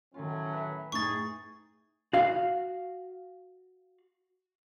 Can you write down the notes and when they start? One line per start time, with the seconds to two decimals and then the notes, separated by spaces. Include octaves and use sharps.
0.14 A2 D#3 F#3 C#4 F4
0.53 B4 E5
0.92 A2 D#4 G#4 G5 C#6 A6
2.13 F#4 F5